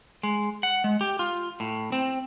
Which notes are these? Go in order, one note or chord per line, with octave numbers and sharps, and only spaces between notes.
G#3
F#5
G#3
G4
F4
A2
C4